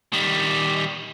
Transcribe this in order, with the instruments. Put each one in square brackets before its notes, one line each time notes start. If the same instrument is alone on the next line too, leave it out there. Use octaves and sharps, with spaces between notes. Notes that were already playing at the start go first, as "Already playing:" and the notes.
[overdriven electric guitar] D#3 G3